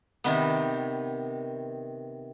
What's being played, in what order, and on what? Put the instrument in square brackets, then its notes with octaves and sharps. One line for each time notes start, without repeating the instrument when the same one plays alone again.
[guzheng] C3 D#3 B3